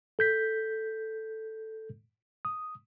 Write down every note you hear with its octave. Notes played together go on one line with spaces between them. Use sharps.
A4 G6 B6
D#6